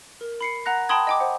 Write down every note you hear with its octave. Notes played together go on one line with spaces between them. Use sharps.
A#4
B5 C7 C#7
F#5 A#5 F#6 A#6
G5 A5 B5 C6 D#6 G#6
D#5 G5 D6
C5 F#5